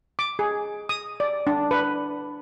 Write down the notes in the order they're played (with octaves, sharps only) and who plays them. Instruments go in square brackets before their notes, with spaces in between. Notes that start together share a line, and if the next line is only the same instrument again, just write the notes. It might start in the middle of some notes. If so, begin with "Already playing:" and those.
[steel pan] D6
G#4
D#6
D5
D4
B4